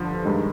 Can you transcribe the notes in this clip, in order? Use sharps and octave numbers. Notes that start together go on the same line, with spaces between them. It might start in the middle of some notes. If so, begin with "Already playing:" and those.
Already playing: G2 D3 F3
G2 D#3 G#3